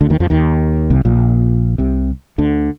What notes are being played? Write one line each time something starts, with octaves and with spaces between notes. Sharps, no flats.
D2 D3
D#2 D#3
F2 F3
D#2 D#3
C2 C3
A#1 A#2
C2 C3
D2 D3